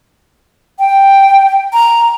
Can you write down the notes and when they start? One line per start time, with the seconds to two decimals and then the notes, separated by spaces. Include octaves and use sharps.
0.79 G5
1.73 A#5